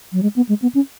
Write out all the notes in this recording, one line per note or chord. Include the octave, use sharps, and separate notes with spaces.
F#3
G#3
B3
G#3
B3
C#4